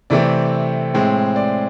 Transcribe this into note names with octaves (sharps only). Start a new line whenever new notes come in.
C3 E3 A3 C4 D5
A2 G#3 C4
D5